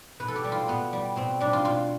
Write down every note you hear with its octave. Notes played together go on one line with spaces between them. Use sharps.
B2 B4
A4
G4
G3
F4
B2 B3
G3
B2 C4
G3 D4
F4
B2 F4